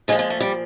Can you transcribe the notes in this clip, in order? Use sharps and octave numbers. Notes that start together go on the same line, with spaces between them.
A#2 F3 G#3
G#3
A3
G3